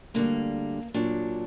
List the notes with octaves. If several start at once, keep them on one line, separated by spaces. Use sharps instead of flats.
D2 D3 G3 A#3
A#2 F#3 D4